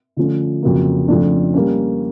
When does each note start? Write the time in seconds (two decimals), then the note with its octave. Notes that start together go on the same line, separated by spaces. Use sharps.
0.17 D3 F3 A3 C#4
0.62 F2 C#3 F#3 A#3
1.08 F2 C#3 F3 A3 D4
1.54 G3 A#3 C#4